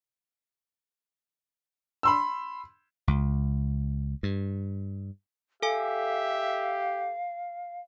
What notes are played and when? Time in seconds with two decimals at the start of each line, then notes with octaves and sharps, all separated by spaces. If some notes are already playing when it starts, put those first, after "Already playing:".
2.03 B5 C6 E6
3.08 C#2
4.23 G2
5.62 G4 A4 E5 F5 G#5